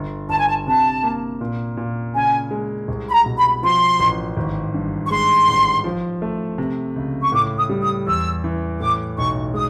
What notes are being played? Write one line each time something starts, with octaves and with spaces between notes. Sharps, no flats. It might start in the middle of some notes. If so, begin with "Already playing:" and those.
Already playing: G1
G1 A5
G#5
A5
C3 A5
A#3
A#2
A#2
C#3 G#5
G#3
C2
B5
A#5
B2
B5
F3 C6
A1
G#1
G2
C#6
G#3 C6
A1
F3
A3
C3
C#2
C#6
A2 D6
D#6
G3
D#6
E2 E6
E3
A2 D6
B1 C#6
G#3 D#6